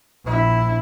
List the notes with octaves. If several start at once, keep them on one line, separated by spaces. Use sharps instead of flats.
A#1 E4